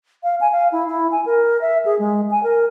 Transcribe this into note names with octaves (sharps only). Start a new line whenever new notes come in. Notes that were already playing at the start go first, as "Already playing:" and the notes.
F5
G#5
F5
E4
E4
G#5
A#4
E5
G#4
G#3
G#5
A#4